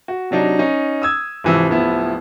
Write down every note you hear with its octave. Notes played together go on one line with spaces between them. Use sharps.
F#4
C3 F#3 D4 D#4
C#4 D#4
D#6 E6 G#6
G#1 C3 E3 F3 E6
D1 F3 B3 E4